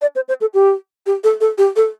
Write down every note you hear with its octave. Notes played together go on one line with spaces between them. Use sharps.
D5
C5
C5
A4
G4
G4
A4
A4
G4
A4